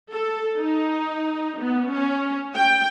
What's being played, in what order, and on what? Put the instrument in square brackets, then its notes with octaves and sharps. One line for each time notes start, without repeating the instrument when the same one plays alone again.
[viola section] A4
D#4
B3
C#4
G5